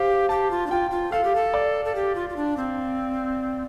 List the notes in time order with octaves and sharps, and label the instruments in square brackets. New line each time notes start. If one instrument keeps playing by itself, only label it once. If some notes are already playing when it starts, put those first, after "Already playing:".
Already playing: [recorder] G4 [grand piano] C5 F5
[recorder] G4 [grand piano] A5
[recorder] F4
D4
[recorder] F4 [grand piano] G5
[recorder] F4
[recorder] A4 [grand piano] F5
[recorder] G4
A4
[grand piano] D5
[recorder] A4
G4
F4
F4
D4
C4